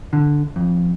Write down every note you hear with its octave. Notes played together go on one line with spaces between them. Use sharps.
D3
F2